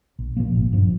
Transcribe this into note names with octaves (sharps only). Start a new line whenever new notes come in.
A#1
A#2 F3 A#3
G#1
G2 F3